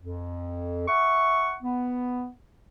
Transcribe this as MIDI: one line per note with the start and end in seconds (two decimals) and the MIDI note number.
0.01 0.87 41
0.88 1.54 76
0.88 1.54 78
0.88 1.54 85
1.63 2.30 59